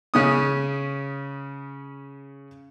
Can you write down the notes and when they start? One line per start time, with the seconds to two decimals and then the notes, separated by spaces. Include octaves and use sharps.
0.14 C#3 C#4 D#6